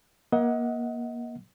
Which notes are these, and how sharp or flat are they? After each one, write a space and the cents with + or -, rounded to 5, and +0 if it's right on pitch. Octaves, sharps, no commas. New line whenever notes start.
A#3 +30 D#5 +35 F#5 +0